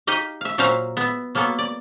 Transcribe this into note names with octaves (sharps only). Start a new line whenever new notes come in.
D#4 G4 D#5 F5
E5 F5
A#2 F#3 C5 E5 F5 A#5
B3 E5
F#3 A#3 B3 A4
D5